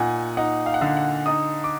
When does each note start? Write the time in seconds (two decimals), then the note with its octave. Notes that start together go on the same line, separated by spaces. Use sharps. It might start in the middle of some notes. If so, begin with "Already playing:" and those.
Already playing: A#2 D#4 F#5 G#5
0.37 D#4 F#5
0.66 F5
0.74 F#5
0.81 D3 F5
0.97 F#5
1.26 D#4 D#6
1.64 D6